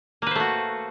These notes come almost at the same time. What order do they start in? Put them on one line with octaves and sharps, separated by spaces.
A#3 B4 C5 A3 F#4